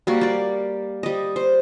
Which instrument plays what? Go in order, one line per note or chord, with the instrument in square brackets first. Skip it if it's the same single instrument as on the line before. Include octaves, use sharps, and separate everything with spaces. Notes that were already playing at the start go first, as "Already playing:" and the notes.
[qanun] G3 A#3 F#4
G3 D5
G3 D#5
C5